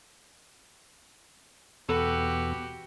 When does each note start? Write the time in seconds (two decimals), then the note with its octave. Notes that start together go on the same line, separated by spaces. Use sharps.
1.89 E2 B2 F#4 G4 A4 B4